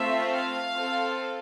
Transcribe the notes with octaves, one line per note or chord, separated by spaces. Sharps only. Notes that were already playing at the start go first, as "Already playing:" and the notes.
Already playing: A3 C4 F4 E5
F5
C4 F4 A4